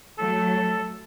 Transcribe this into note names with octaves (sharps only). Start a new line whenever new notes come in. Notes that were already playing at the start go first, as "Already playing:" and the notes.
F#3 A3 A4